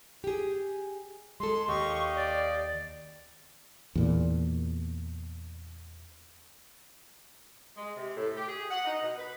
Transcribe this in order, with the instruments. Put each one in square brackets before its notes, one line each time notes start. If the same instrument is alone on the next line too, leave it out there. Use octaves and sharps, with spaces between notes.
[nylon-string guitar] G4 G#4
[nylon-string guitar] G#3 A4 [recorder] C6
[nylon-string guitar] D#2 [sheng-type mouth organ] G4 D#5 F5 [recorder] C#6
[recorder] D5
[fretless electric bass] E2 A#2
[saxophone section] G#3
C3
A2
G4
G#4
F#5
D#4
B2
B4